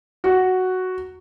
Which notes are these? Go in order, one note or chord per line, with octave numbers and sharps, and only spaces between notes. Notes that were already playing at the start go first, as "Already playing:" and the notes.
F#4